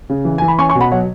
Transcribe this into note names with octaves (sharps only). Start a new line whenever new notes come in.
C#3
E3
E3 G#5
B5
C#4 G#5 C#6
G#5 C#6
B2
F#5 B5
F#3 C#5 F#5